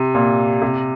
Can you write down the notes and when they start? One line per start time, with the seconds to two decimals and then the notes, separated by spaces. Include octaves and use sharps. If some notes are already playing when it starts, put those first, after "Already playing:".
Already playing: C3
0.15 A#2
0.62 C3